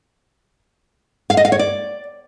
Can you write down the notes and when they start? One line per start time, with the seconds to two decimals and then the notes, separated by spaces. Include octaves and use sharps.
1.30 F5
1.37 D#5
1.45 F5
1.52 C#5
1.59 D5